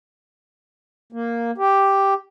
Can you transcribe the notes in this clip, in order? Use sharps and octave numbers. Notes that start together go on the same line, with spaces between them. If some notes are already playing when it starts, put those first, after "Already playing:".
A#3
G4